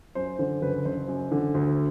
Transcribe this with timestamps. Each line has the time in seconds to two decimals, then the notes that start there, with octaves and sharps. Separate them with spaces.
0.15 F#2 C5
0.39 D3 C5
0.62 F#1 B4
0.85 F#1 C5
1.08 F#2
1.32 D3
1.55 D2